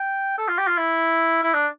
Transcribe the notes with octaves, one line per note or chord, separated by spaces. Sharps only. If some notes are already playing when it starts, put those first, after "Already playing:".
Already playing: G5
A4
F4
G4
F4
E4
E4
D4